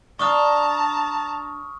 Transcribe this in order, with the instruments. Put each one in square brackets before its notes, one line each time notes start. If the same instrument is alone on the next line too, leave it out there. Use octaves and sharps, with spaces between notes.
[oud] D4 F5 [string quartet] A5 A#5 [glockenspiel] C#6 D#6 F6